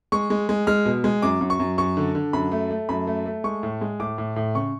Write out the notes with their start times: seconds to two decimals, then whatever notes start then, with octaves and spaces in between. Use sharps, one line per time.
0.12 G#3 C#6
0.30 G#3
0.49 G#3
0.67 G#3 F6
0.85 B2
1.04 G#3
1.22 F#2 D6
1.41 F#2
1.50 C#6
1.59 F#2
1.78 F#2 C#6
1.97 D3
2.15 D3
2.33 F#2 B5
2.51 A3
2.70 A3
2.89 F#2 B5
3.07 A3
3.26 A3
3.44 G#3 C#6
3.63 A2
3.81 G#3
4.00 A2 D6
4.18 A2
4.36 A2
4.55 C#3 C#6